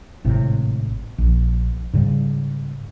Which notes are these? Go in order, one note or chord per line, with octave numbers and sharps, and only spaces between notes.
G#1 A2 C3
A#1
G#2 C#3 G3